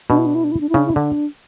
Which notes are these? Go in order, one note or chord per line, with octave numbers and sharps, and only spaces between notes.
B2 D4
E4
D4
E4
D4
E4
D4
E4
C#3 D4
E4
D3 D4